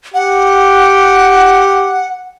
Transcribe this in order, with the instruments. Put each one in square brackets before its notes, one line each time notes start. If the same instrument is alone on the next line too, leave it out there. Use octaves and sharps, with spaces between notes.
[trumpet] G4 [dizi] F#5